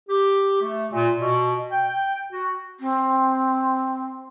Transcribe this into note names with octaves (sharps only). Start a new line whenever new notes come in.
G4
A3
A#2
B2
G5
F#4
C4